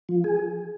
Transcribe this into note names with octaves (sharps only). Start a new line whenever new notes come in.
F3
G#4